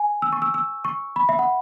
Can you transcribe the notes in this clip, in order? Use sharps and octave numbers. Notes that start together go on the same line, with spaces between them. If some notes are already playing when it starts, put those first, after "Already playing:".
Already playing: G#5
E6
C#6
E6
E6
C#6
B5
E5
F#5